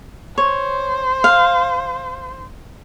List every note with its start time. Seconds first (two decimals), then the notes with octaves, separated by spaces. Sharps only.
0.38 C5 C#5
1.24 F5